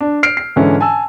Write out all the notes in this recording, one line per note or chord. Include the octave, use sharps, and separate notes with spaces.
D4
F6 C7 D7
C7
G#2 D3 E3 C#4
G#5 A5 E6